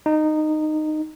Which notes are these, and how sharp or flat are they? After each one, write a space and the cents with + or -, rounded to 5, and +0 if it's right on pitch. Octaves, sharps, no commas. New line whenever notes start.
D#4 -15